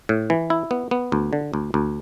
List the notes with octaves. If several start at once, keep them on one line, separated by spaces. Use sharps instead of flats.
A2
E3
E4
B3
B3
D2
D3
D2
D2